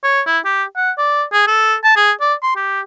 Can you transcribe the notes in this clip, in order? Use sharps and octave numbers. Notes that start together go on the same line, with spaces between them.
C#5
E4
G4
F#5
D5
G#4
A4
A5
G#4
D5
C6
G4